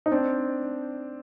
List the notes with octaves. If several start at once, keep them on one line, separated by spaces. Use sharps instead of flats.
D#4
C4 D4